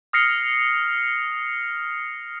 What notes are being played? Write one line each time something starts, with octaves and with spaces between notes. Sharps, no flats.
D#6 F6 A#6 C7 C#7